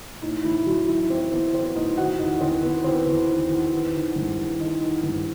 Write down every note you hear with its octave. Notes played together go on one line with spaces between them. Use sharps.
A2 D#4
A2 E3 E4
E3 F#3 F#4
E3 E4 E5
E3 C4 C5
E3 B3 B4
E3 C4 C5
A2 D#4 D#5
D#3 F#4 F#5
E2 D#4 D#5
E2 C4 C5
D#3 B3 B4
E2 C4 C5
E2
D#3
E2
D#3
D#3
G2
D#3
D#3 D#4 D#5
D#3
G2